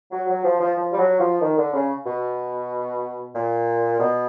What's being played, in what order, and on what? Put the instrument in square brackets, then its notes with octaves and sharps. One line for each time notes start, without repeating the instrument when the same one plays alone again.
[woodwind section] F#3
F#3
F3
F3
F3
G3
F#3
F3
D#3
D3
C#3
B2
A#2
B2